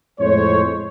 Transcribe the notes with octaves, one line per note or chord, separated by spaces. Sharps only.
F2 A2 G#3 C5 C#5